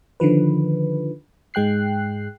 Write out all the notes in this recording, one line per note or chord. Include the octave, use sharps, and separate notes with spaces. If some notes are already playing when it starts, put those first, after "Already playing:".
D3 D#3 F3 B4
G#2 G#3 G5 F#6 C7